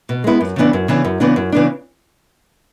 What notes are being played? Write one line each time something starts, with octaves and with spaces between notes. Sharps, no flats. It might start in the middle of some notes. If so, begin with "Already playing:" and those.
B2
G#3 B3 E4
F#2
C#3 E3 B3 D4
F#2
C#3 E3 B3 D4
F#2
C#3 E3 B3 D4
F#2
C#3 E3 B3 D4